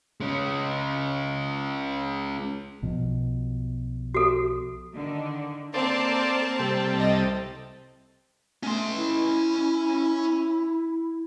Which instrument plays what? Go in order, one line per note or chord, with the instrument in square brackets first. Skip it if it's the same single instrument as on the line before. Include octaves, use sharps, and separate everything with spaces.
[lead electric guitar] G#3 C#4
[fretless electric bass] B1 B2 F3
[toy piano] F#4 A4
[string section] D3 D#3
[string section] A#3 A#4 A5 [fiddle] C4 [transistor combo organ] A4 C5 D5
[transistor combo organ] C3 G3 A4
[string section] C2 D#5
[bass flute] A3 [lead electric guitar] C#4 C6
[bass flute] E4